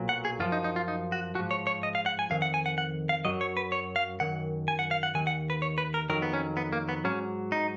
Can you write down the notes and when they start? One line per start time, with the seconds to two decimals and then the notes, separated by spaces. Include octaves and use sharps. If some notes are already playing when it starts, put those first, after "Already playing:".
Already playing: B1 A#2 F#3
0.09 F#5
0.25 G#4
0.40 F#2 F3 F4
0.52 D#4
0.64 D#4
0.76 F4
0.88 D#4
1.12 F#4
1.35 F3 F#4
1.39 G#2
1.51 C#5
1.67 C#5
1.83 D#5
1.95 F5
2.06 F#5
2.19 G#5
2.30 F2 D#3 F5
2.42 F#5
2.54 G#5
2.66 F#5
2.78 F#5
3.09 F5
3.25 F#2 C#3 F#3 D#5
3.41 C#5
3.57 B4
3.72 C#5
3.96 F5
4.20 F#2 D#3 F#5
4.68 G#5
4.79 F#5
4.91 F5
5.03 F#5
5.15 D#2 D#3 G#5
5.27 F#5
5.50 B4
5.62 C#5
5.78 B4
5.94 A#4
6.10 F2 D#3 F#3 A#4
6.22 B3
6.33 C#4
6.57 B3
6.73 A#3
6.89 B3
7.04 G#2 F#3 C#4
7.52 D#4